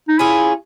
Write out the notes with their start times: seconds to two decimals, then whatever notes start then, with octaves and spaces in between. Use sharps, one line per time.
0.08 D#4
0.19 C#4 E4 F4 G#4